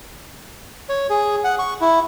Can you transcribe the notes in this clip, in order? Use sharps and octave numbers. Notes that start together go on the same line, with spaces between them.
C#5
G#4
F#5
C#6
E4